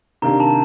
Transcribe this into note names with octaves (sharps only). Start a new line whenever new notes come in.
C3 D#3 A#3 D4 G4 A#5
A5